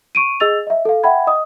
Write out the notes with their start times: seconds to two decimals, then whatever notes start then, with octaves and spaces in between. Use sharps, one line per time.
0.15 C#6 D7 D#7
0.40 G#4 D#5 E6 A6 F7
0.67 D#5 E5
0.85 A4 F5
1.03 E5 F#5 G5 B5 G#6
1.27 D#5 D#6